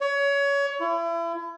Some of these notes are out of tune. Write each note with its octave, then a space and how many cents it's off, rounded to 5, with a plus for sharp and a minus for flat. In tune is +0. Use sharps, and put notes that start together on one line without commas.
C#5 +25
E4 +35